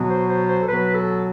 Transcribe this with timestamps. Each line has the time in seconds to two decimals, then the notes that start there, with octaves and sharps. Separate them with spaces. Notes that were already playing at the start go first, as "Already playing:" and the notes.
Already playing: B2 F#3 B3
0.09 C5
0.29 C5
0.48 C5
0.61 A4
0.67 B2 F#3 B3 B4
0.94 A4